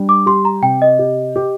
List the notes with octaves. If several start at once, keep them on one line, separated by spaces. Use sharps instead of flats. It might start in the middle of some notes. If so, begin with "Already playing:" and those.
Already playing: G3 D4
D6
G4 C6
A#5
C3 G5
D#5
G4
G4